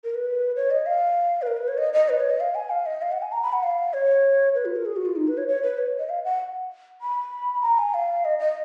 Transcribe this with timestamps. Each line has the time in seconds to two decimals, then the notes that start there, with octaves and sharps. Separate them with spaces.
0.04 A#4
0.15 B4
0.56 C#5
0.71 D#5
0.86 F5
1.42 B4
1.47 A#4
1.57 B4
1.68 C#5
1.78 D#5
1.93 D#5
2.09 B4
2.20 C#5
2.30 D#5
2.40 F5
2.55 G#5
2.70 F5
2.86 D#5
3.02 F5
3.12 F#5
3.22 G#5
3.32 A#5
3.43 B5
3.53 F#5
3.63 F5
3.94 C#5
4.55 B4
4.65 F4
4.76 A#4
4.86 G#4
4.96 F#4
5.06 F4
5.16 D#4
5.27 B4
5.38 C#5
5.48 C#5
5.63 B4
5.78 C#5
5.99 D#5
6.09 F5
6.24 F#5
7.02 B5
7.62 A#5
7.78 G#5
7.94 F5
8.25 D#5
8.39 D#5